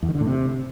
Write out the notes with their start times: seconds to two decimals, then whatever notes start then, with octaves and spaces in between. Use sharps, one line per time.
0.03 E2
0.09 D#3
0.15 D3
0.21 A2
0.27 C3